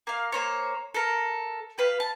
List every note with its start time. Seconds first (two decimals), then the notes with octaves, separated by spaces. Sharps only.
0.07 A#3 F5
0.32 A#3 C5 C#5
0.94 A4 A#4
1.78 G4 B4 F5
2.00 A5